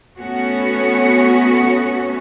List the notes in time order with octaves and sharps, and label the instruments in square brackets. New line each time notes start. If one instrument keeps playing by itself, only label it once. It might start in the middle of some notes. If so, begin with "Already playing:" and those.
[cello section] A3 B3 C#4 F#4